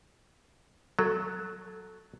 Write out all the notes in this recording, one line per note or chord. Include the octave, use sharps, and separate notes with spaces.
F#3 A4